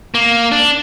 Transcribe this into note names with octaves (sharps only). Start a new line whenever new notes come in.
A#3
D4